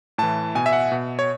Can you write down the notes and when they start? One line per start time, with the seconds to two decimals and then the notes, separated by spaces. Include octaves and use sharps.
0.18 A2 E3 A5
0.55 B2 G#5
0.66 E5
0.73 F#5
0.92 B2
1.19 C#5